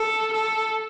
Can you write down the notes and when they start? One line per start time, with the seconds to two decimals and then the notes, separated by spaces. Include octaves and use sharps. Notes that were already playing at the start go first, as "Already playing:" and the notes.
Already playing: A4
0.33 A4